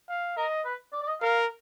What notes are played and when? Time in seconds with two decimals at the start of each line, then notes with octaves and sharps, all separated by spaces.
0.09 F5
0.37 A#4 D#5
0.65 B4
0.93 D5
1.03 D5
1.08 D#5
1.21 A#4 F5